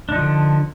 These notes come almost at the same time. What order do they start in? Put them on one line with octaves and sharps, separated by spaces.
D4 D#4 F3 D3